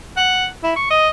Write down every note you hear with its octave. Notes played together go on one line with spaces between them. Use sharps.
F#5
E4
C#6
D#5